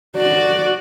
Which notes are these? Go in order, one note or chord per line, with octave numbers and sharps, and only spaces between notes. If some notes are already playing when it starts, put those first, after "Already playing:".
F#4 D5